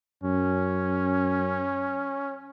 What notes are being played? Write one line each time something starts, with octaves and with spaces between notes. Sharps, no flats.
F#2 C#4